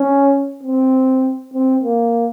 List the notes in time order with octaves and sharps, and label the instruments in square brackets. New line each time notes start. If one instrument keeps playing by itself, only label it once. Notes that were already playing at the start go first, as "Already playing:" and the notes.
Already playing: [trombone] C#4
C4
C4
A#3